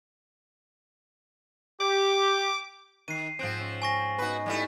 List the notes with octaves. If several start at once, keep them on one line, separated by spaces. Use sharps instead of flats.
G4 D6
D#3 C7 D#7
G#2 F3 C4 F#6 D7
C#4
G#5 C#6 A#6
B3 D#4 F#4 B4
G3 A3 E4